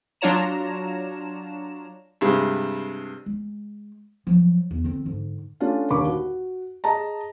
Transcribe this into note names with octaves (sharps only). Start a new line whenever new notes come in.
F#3 D4 F4 C#5 A#5 E7
G2 C3 G3 G#3
G#3
F3 F#3
E2
D3 C4
G#2 D3
A3 C#4 D4 F4
D#1 D#2 D3 B5 C#6 D6
F#4
G#4 D#5 A5 A#5